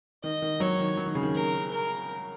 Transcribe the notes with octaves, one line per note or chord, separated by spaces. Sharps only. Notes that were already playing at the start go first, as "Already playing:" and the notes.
D#3 D#5
D#3
F#3 C#5
D#3
F#3
D#3
C#3
D#3
A#4
A#4